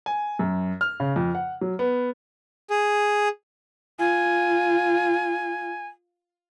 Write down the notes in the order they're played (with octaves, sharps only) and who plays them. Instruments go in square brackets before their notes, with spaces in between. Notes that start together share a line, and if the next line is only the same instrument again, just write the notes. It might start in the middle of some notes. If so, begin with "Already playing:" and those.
[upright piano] G#5
F#2
F6
C#3
F2
F#5
F#3
B3
[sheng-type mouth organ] G#4
[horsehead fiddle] F4 [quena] G#5